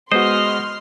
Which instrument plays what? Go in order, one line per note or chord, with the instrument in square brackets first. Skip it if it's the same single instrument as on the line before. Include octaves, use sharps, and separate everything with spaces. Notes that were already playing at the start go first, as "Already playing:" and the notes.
[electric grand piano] G#3 B3 F#4 [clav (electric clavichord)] C5 [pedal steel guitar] D#5 [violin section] C6 F6